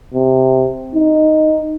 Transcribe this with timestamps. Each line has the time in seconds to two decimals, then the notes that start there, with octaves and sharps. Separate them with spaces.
0.14 C3
0.95 D#4